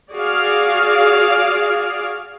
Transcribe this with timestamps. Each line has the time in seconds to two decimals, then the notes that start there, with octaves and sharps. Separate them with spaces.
0.14 F#4 G#4 D5 F5